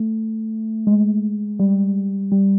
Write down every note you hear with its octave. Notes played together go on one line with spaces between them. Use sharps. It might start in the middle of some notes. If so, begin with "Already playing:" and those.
Already playing: A3
G#3
G3
G3